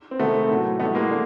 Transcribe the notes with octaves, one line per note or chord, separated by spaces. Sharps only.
C4
C3 D#3 G#3 A3 B3
A2 F#3
A2 E3 G3 A3 B3
G#3 A#3
D3